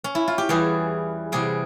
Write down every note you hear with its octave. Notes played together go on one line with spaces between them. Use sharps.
C#4
E4
F4
G4
E2 E3 G3 G#4
E2 C3 G3 G#4